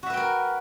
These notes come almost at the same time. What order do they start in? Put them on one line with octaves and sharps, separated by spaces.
F#4 E5 B4 G5 A#4